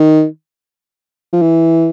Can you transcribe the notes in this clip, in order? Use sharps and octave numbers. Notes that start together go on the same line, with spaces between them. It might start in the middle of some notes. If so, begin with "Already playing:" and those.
Already playing: D#3
F3
E3